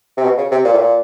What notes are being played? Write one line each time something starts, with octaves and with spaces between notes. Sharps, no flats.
C3
B2
C#3
C3
A#2
A2
A#2